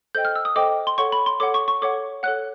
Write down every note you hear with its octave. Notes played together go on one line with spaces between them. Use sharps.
A4 C5 D#5 G5 G6
F6
E6
D#6
A4 C5 D#5 G5 D6
C6
A4 C#5 F#5 C#6
B5
C6
A4 C#5 F#5 D6
C#6
C#6
A4 C#5 F#5 D6
A4 C#5 F#5 F#6